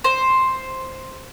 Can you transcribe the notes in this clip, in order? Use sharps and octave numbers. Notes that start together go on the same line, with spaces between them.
C5